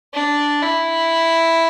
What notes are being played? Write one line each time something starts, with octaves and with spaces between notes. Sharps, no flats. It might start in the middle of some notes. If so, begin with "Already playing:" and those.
D4
E4